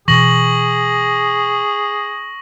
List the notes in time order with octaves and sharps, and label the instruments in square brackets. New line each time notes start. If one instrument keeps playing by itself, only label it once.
[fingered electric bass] B2 E3 [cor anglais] G#4 [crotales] C#6 A#6 F#7